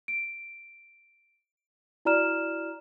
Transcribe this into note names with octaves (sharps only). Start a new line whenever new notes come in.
D7
E4 F#4 D5 A#5 F6 E7